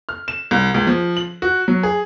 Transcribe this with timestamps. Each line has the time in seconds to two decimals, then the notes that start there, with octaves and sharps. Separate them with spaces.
0.09 F6
0.28 E7
0.51 C2
0.74 C#2
0.87 F3
1.17 F#7
1.42 F#4
1.68 F#3
1.83 G#4